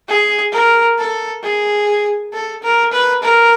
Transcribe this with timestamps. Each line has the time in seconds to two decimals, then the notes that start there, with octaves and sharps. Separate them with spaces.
0.09 G#4
0.53 A#4
0.98 A4
1.43 G#4
2.33 A4
2.63 A#4
2.92 B4
3.23 A#4